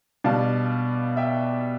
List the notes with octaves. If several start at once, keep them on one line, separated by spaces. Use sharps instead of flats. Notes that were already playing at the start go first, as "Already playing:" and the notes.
B2 G3 D4 F5 A5
E5 G5